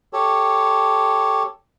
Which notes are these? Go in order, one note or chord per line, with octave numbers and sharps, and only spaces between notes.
G4 A4 C#5